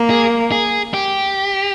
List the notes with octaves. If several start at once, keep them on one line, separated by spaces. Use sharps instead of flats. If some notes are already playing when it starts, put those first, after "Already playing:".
Already playing: A#3
G#4
G#4
G4